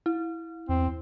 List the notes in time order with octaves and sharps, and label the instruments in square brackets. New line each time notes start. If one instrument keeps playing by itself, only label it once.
[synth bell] E4
[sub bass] E2 [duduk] C4